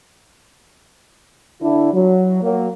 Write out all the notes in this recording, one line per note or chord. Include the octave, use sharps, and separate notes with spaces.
D3 D4 E4
F#3
F#3 A#3